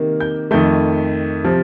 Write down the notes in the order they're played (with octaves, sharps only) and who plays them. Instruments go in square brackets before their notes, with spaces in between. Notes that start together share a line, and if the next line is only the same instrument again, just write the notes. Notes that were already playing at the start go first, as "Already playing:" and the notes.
Already playing: [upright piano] C3 D#3 A#3
G6
F2 D#3 A3 G6
C3 F3 C4